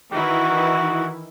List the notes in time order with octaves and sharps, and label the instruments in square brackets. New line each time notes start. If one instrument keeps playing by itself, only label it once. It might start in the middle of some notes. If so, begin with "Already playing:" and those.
[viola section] D#3 E3 E4 [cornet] F#4